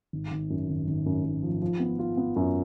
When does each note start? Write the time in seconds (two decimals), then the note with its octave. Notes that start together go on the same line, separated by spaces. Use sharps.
0.13 G#1
0.31 G#1
0.50 F#2
0.69 G#1
0.87 G#1
1.06 F#2
1.25 F#2
1.43 F3
1.62 F3
1.80 B3
1.99 F4
2.17 B3
2.36 F#2